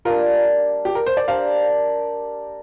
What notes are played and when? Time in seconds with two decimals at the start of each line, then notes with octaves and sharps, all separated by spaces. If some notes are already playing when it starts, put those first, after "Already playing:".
0.05 G3 A#3 D4 F4 A#4
0.85 G4
0.95 A#4
1.06 C5
1.17 D5
1.28 D4 G4 A#4 C5 D5 F5